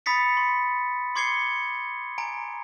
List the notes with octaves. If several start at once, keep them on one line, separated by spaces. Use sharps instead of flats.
B5 D#6 A6 B6 C#7
C6
C6 D6 G#6 C7 C#7 G7
G#5 A#5 D7